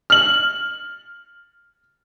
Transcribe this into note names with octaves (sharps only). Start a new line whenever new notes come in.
F6 F#7